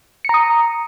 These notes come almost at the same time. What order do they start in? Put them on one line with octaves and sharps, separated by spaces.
C#7 A#5 D#6